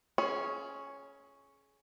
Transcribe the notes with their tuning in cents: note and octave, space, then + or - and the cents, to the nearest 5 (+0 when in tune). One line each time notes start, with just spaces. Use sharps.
C#4 +0 G#4 +30 C#5 +0